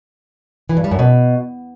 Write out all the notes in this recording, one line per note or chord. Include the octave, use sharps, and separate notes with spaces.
E3
G2
G3
F#2
B2